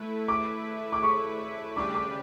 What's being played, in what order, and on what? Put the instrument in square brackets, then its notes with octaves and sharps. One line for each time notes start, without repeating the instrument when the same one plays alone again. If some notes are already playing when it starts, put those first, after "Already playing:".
Already playing: [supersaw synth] A3 E4 B4
[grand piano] D6
D6
C#6
[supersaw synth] C#3 G3 D4 G4 B4 [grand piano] D6
[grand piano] D6